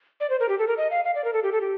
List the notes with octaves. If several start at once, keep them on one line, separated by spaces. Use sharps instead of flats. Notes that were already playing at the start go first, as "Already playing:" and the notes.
D5
C5
A#4
G4
A4
A#4
D#5
F5
F5
D5
A#4
A4
G4
A4
G4